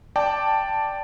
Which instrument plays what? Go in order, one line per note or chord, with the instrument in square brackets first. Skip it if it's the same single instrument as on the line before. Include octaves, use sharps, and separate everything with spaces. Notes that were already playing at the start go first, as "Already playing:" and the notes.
[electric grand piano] D5 G5 A5 D6